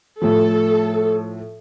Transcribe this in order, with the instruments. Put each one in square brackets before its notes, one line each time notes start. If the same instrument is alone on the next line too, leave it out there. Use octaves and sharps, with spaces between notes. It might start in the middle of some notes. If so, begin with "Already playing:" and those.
[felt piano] A2 F3 [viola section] A4